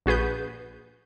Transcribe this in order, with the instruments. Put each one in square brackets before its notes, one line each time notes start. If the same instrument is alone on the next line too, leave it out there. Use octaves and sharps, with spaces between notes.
[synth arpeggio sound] A#1 F#4 G#4 B4 G6